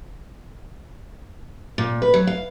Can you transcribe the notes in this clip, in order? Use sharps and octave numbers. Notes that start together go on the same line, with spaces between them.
A#2
B4
F#3
F5